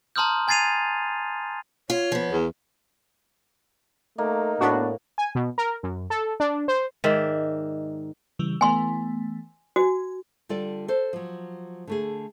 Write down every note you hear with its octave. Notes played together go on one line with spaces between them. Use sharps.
A5 A#5 C6 D#6 F6 G6
G#5 G#6 A6 C7 D#7 F7
F4 C#5
F3 B3
E2
A3 A#3 D#4
A2 B3 D4 F#4
G#5
B2
A#4
F#2
A4
D4
C5
G#2 D#3 D5 E5
C#3 E3 G3
E3 A3 B3 G#5 C6
F#4 G#5
D3 G3 F4 A4 D5
A4 C5
F3 F#3
D3 A3 G#4